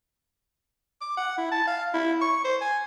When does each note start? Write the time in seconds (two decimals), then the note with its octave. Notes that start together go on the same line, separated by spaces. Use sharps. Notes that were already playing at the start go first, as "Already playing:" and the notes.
1.01 D6
1.17 F#5
1.38 E4
1.51 A5
1.67 F5
1.94 E4
2.22 C#6
2.45 C5
2.61 G#5